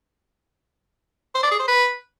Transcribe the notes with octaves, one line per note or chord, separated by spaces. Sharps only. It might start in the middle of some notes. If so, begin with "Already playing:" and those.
C5
D5
G#4
C5
B4